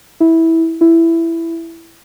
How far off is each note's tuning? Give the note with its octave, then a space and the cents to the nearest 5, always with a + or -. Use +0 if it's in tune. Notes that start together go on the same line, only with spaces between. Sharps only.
E4 -15
E4 +10